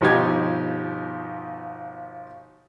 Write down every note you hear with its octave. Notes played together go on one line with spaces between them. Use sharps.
G1 B2 F3 D#4 G4 G#6